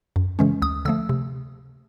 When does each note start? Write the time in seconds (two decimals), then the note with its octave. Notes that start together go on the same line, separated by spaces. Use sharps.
0.16 F#2
0.39 C#3 E3 G#3 C#4
0.62 D2 D#6
0.85 D3 F3 A3 E6
1.09 C3